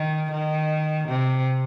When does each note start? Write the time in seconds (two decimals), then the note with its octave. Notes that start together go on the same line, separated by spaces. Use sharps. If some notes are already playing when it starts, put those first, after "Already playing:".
Already playing: D#3
0.31 D#3
1.09 C3